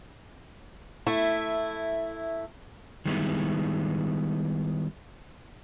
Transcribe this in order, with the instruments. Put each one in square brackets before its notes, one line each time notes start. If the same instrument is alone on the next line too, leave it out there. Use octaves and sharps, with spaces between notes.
[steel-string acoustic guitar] A3 E4
[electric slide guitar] D#3 G3 G#3 B3 D#4 E4